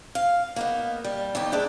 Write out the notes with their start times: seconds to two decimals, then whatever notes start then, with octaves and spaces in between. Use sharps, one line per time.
0.15 F5
0.56 A#3 B3 D#4
1.04 G3
1.35 D#2 B2 G4 G5
1.52 G#3 D4 E4